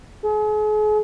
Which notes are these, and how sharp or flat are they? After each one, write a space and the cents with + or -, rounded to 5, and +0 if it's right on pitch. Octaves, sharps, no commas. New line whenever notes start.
G#4 +40